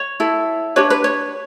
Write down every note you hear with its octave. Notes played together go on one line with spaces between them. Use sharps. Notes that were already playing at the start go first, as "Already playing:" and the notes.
Already playing: C#5
E4 A4
D4 G4 B4 C#5
B4
C#5